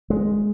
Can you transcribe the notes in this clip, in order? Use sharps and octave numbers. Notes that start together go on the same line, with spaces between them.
G#3